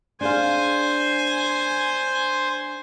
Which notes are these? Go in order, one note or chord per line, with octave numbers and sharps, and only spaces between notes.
D4 G#4 C5 F5 G#5